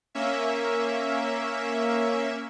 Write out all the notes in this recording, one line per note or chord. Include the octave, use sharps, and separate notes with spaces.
A#3 C#4 E5